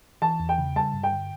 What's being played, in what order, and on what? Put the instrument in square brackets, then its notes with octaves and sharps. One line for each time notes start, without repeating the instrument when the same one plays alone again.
[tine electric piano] E3 [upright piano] A5
[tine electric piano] E2
[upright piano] G5
[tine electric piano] C#3
[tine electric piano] G3 [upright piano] A5
[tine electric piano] G2
[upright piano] G5
[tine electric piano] D3